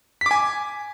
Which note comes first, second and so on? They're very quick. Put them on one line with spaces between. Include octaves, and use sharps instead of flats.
B6 D6 G#5